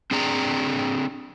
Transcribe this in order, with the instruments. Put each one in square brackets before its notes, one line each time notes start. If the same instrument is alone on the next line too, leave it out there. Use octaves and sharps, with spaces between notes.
[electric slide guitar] C4 D4 G#4 D5 G5 A#5